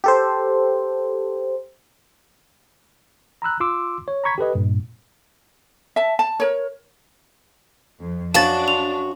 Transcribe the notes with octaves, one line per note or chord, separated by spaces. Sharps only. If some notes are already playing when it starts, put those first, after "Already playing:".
G4 A4 C5
A#5 B5 E6 F#6
F4 C6 D6 E6
C#5
A#5 B5 C#6 G#6 B6
G4 A4 B4 D#5
G2 A#2
E5 A5
A5
A#4 C#5
F2
F#2 D4 F#4 C5 F5 A5 A6 E7
A5 C6 C#6 F7